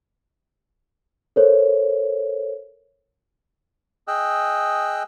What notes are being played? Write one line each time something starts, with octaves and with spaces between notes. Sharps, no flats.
A4 A#4 C5 C#5
G#4 D#5 G5 E6 F#6